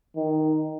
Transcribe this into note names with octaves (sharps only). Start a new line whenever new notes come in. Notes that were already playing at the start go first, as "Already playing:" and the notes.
D#3